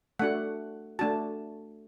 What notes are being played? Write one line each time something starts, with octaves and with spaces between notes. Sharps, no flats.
A3 D4 F#4 F#5
A3 D4 F#4 A5